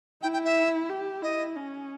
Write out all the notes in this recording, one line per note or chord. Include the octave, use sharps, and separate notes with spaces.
E4 G5
G5
E5
G4
E4 D#5
C#4